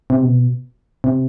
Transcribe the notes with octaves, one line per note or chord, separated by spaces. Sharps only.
C3
B2
C3